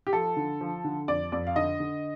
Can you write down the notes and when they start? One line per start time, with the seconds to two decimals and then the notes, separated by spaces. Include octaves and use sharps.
0.07 G4
0.13 F3 A4
0.37 D3
0.61 F3
0.84 D3
1.08 F2 D5
1.32 F2 D5
1.47 F5
1.56 D3 D#5
1.80 D3